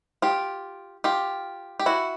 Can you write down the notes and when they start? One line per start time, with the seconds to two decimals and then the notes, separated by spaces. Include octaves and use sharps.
0.22 F4 G4
1.04 F4 G4
1.79 G4
1.86 E4 F#4